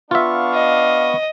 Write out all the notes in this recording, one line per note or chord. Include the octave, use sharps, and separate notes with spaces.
B3 D4 F4 E5 F5 C#6
D#5